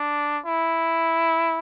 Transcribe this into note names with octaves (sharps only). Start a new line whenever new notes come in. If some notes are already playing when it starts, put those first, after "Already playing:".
Already playing: D4
E4